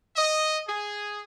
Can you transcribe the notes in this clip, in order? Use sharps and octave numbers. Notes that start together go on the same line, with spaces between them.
D#5
G#4